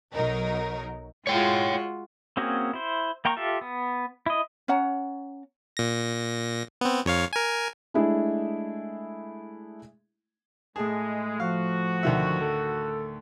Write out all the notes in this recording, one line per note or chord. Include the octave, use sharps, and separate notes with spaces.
B1 F#3 D#4 A#4
G#3 F4 F#4 C#5 G5
A#3 C4 C#4 F#4 G#4
E4 C5
A#3 G5 A#5 C#6
F4 G4 A4 E5
B3
E4 D#5
C#4 C#5 F#5 A#5
A#2 A#6
B3 C4
F2 C#5 F5
A#4 G#5
G#3 A3 D4 E4 G#4
A2 G#3 G#4 A5
F3 F#4 F5
D2 D#3 E5
A4